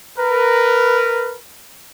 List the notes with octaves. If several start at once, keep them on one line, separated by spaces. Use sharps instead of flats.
A#4 B4